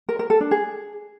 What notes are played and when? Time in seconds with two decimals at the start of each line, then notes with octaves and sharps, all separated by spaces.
0.09 A#4
0.19 A#4
0.30 A4
0.41 D4
0.51 G#4